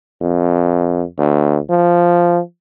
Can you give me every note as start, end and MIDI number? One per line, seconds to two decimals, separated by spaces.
0.21 1.03 41
1.18 1.57 38
1.70 2.39 53